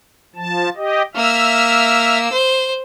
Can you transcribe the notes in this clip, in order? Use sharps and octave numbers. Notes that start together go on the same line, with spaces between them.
F3 A5
G4 D#5
A#3 E5 E6 F6
C5